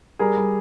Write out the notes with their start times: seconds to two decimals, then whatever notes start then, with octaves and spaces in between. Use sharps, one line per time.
0.19 G3 G#4 A#4
0.37 G3